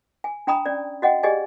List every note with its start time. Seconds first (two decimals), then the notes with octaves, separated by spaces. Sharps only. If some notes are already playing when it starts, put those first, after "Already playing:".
0.24 G#5
0.47 D4 G5 A#5 B5 D#6
0.66 C#4 D5
1.02 F#4 D#5 F#5 G5
1.23 G4 G#4 D5 D#5 G#5